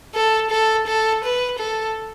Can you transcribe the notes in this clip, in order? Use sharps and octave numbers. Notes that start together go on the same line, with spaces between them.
A4
A4
A4
B4
A4